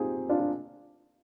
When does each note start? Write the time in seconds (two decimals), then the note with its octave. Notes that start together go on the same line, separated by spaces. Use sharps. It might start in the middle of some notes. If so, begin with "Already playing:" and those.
Already playing: C4 D#4 F4 G4 G#4
0.29 D4 F4
0.40 F4